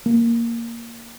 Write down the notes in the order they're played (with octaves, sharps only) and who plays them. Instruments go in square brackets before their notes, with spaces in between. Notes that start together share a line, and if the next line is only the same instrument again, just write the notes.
[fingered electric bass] A#3